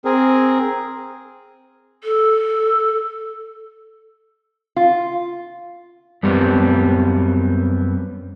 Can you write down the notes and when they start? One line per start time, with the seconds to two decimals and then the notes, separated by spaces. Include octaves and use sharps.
0.05 C4 G#4 A#4
2.04 A4
4.76 F4
6.23 F#2 G3 B3 C4